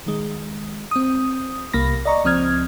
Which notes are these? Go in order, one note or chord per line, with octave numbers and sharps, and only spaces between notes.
D#3 G#3
C4 D#6
C2 A#3 B5 A#6
D5 D#5 A#5 C#6
C#2 F3 C4 D#6 F6 G#6